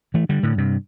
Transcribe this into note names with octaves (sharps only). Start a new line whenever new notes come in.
E3 A3
D3 G3
A2 D3
G2 C3